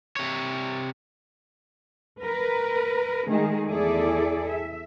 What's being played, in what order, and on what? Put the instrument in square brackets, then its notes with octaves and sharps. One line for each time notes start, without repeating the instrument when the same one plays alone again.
[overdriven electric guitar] C3 C#5
[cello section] A#4 B4
D#3 G#3 A3 G#4
E2 E4 G#4 A4 D5
E5